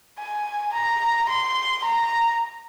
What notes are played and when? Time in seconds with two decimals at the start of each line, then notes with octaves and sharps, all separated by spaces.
0.19 G#5
0.74 A#5
1.29 C6
1.85 A#5